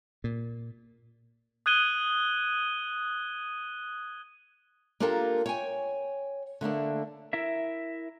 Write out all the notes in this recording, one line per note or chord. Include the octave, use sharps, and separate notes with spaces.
A#2
D#6 F#6 G#6 D#7 G7
A#3 D4 F4 G4 A4 A#4
C#5 G5 G#5
D3 A3 A#3 D4
E4 A#4 E5